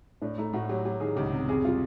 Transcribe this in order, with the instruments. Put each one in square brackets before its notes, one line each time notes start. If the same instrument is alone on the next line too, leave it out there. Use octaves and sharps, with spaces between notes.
[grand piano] A2 [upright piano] D4
[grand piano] A3 [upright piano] D#4
[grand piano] A2 [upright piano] F#4
[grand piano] F#3 [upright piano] G4
[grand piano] F#3 [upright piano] G4
[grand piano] D#3 [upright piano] G#4
[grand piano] C#2 [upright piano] G4
[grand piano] C3
[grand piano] F2 [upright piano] G#4
[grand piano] G3 [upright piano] F4